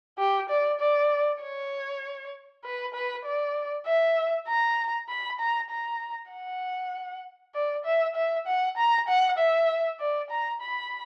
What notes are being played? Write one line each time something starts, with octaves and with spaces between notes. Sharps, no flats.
G4
D5
D5
C#5
B4
B4
D5
E5
A#5
B5
A#5
A#5
F#5
D5
E5
E5
F#5
A#5
F#5
E5
D5
A#5
B5